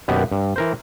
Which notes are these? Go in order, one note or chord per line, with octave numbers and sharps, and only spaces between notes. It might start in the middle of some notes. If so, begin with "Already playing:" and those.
F#2 B2 D#3 A#3 B3 G4
G2
E3 A#4 C5